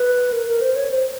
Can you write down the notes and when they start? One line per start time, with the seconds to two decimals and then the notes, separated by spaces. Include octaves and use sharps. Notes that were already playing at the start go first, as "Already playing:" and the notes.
Already playing: B4
0.32 A#4
0.47 A#4
0.61 C5
0.76 C#5
0.91 C5